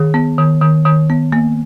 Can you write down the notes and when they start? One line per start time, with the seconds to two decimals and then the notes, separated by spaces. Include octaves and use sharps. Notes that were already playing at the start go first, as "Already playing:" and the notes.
Already playing: D#3 G#4
0.14 B3
0.38 D#3
0.61 D#3
0.85 D#3
1.10 B3
1.32 A#3